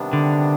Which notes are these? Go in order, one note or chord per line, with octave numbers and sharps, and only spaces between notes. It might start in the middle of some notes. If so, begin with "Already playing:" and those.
Already playing: C3 D#3 G3 B3 D4
D3